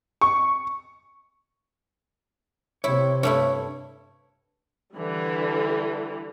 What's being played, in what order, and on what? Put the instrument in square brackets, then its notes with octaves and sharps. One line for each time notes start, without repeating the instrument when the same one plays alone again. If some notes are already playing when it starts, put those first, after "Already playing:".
[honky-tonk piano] C#6
[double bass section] C3 [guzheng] E4 [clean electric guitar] C#5
[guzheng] G2 A3 E4 [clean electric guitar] C#5
[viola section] D3 E3 G3